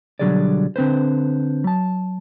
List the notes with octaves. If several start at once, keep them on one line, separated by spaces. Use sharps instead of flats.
B1 D3 F#3 G3 G#4 D5
D3 C4 B4 C5
F#3 A5